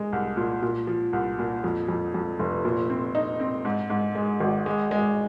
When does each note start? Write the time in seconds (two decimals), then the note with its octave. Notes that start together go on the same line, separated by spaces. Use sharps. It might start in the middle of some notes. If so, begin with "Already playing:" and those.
Already playing: G#3
0.13 C2
0.37 A#2
0.63 A#2
0.87 F3
1.13 C2
1.39 A#2
1.64 F2
1.88 F2
2.14 F2
2.39 F1
2.65 A#2
2.90 C4
3.15 D#4
3.40 C4
3.65 G#2
3.90 G#2
4.15 G#3
4.40 G#1
4.66 G#3
4.91 G#3